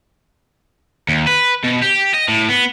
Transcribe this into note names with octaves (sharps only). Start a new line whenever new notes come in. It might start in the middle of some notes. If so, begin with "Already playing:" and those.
D#2
B4
B2
G4
D#5
A2
B3